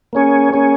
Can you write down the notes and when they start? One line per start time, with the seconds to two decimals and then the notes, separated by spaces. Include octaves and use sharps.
0.13 A#3 C#4 G#4 C#5
0.53 A#3 C#4 G#4 C#5